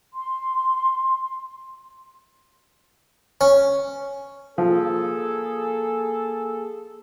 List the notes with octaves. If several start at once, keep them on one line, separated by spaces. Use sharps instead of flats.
C6
C#4
F3 A#3 G#4 A4